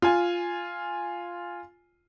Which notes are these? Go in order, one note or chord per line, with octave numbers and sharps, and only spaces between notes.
F4 G#5